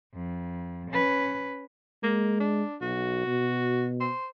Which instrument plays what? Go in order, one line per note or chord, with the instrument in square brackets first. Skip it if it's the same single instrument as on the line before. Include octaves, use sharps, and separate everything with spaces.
[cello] F2
C#4 B4
[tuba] G#3 [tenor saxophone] A#3
[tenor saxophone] D4
[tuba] B1 [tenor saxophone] F#4
[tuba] B2
[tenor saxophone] C5